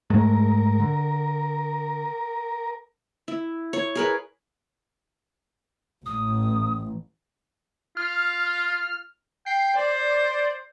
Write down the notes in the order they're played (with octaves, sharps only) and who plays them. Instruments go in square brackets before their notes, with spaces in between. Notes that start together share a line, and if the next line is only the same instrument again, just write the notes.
[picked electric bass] G#2 G#3 A3 [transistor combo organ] A#4
[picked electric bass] D3
[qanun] E4
C#5
G#4 A#4 B4
[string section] A1 [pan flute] D#6
[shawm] F4 [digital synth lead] F6
[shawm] G5 [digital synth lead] C7
[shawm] C5 [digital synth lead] D5